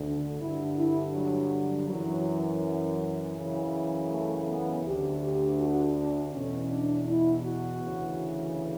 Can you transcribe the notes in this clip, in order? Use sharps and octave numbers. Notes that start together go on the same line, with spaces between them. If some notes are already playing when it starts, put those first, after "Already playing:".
Already playing: D2 D3
G2 D3 E4
E4
F#3
F#2 E3 F#3
F#2 C#3 E3
A3
B3
D2 G4
D3
G4
F#4
D4
E2 B2 C#4
D4
E4
F#4
D2 C#3 E3